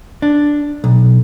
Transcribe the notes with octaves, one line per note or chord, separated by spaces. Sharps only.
D4
B1